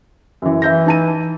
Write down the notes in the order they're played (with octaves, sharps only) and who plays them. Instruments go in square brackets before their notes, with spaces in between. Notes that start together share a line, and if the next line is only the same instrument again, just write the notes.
[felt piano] F#2 E3
[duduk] E3 [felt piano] E5 G6 A#6
[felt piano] D#4 A5 D#7